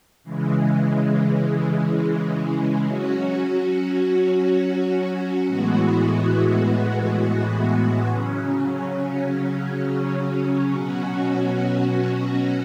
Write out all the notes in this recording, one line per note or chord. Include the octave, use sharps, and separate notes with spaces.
C#3 E3 G#3
F#3 C#4 F#4
A2 E3 G#3 B3 F#4
C#3 F#3 C#4
B2 F#3 C#4 F#4